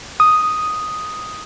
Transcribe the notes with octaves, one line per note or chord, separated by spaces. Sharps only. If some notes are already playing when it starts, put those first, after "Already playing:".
D#6